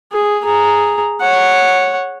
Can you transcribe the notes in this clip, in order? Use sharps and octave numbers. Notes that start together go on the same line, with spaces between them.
G#4
G#4 A#5
C#5 F#5